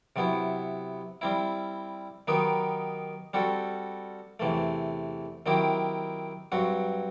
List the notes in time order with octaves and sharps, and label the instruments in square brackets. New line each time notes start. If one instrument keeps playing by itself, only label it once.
[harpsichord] C3 F#3 B3 E4
G3 C4 E4
D#3 F#3 B3 D#4 G4
G3 C4 F#4 A4
E2 C3 E3 A3
D#3 F#3 C4 E4 G4
G2 F#3 C4 F#4